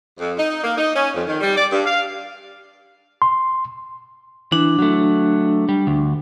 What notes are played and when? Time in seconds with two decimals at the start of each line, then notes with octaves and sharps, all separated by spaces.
0.19 F2
0.38 D#4
0.64 A#3
0.78 D#4
0.95 C#4
1.14 F2
1.27 D#3
1.41 G3
1.57 D5
1.72 G2
1.84 F5
3.22 C6
4.52 E3 D4
4.79 F#3 A3
5.69 G3
5.87 D2